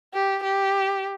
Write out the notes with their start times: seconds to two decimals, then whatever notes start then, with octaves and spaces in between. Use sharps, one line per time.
0.14 G4
0.44 G4